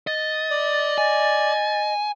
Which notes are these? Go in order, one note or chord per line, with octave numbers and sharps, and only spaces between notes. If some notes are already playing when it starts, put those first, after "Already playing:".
D#5 A6
D5
D#5 G#5